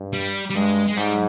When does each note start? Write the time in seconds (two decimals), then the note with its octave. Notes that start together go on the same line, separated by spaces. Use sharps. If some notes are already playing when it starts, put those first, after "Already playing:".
Already playing: G2
0.13 G3
0.50 G3
0.55 G2 G#3
0.87 G#3
0.97 G#2 G3